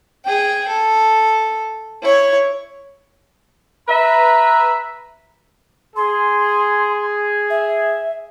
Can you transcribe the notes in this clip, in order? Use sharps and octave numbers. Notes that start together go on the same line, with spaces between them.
G#4 G5
A4
E4 C#5
B4 E5 A#5
G#4 C6
E5